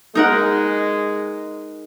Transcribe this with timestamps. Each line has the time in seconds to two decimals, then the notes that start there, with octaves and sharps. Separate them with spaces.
0.15 G#3 D#4 A#4 F#5